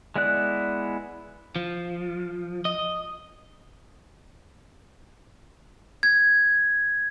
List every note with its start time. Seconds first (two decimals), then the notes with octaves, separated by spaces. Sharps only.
0.16 G#3 B3 E4 D5 F#6
1.56 F3
2.65 D#5
6.03 G#6